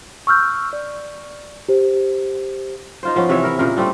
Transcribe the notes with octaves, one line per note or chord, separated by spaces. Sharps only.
C#6 E6 F6 G6
D5
G4 C5
D#4 F4 C5
F3 B3 C#4
C3 E3 C#5 E5
E4 A#4
A#2 C#3 G#4 A#4
G3 A3 C4 D4